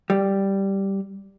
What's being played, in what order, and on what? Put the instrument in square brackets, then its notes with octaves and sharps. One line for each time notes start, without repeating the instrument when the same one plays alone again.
[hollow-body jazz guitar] G3